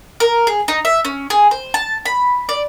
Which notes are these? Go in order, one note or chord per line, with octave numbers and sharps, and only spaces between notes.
A#4
G#4
D#4
E5
C#4
G#4
C5
A5
B5
D5